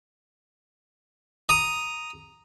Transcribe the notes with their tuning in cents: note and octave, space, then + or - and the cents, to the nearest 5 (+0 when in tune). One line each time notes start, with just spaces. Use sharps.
A#5 +0 D#6 +0